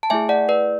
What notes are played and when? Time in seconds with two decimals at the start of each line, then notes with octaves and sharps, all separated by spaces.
0.03 A5
0.10 A3 E4 G#4 E5 G#5
0.29 D5 F#5
0.49 B4 D5